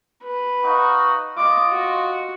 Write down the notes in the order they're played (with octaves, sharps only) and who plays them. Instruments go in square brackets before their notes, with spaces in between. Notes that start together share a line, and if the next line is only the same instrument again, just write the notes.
[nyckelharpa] B4
[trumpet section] D#4 F#4 F5
[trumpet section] F4 D#5 [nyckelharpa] D6
[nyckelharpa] F#4